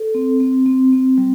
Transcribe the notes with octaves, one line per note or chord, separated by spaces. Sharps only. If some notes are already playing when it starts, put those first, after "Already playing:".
Already playing: A4
C4
C4
C4
C4
G3